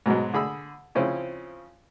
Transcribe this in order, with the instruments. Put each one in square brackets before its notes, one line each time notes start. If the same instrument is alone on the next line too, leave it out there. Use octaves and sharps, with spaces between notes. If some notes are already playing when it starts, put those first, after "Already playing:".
[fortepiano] G#2 B2 F#3 G#3
D3 G#4 B5 E6
C#3 F3 C4 C#4 E4